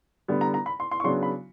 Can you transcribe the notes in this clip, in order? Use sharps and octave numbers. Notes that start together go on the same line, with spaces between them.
D3 G3 B3
A#5
A#5
B5
C6
C6
C#6
C#3 F#3 B3 D4 C6
B5